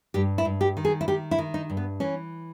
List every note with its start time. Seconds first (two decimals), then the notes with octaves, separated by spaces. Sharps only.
0.14 G2 G4
0.38 E4
0.45 G2
0.61 G4
0.77 D#3
0.85 G#4
1.01 E4
1.08 D#3 G4
1.31 E4
1.39 D#3
1.54 D#4
1.70 G2
1.77 B3
2.00 E3 C#4